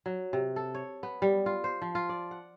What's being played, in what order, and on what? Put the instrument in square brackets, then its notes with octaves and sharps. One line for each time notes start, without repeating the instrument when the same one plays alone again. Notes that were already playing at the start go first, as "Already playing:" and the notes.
[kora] F#3
C3
A4
C#5
B3
G3
F4
C5
F3
F4
D5
F#5